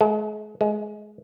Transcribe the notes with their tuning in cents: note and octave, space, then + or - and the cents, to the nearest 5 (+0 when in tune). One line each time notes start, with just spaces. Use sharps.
G#3 +40
G#3 +20